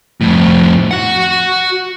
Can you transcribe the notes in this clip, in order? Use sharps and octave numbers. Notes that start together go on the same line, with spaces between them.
F2 A2
F#4 F#5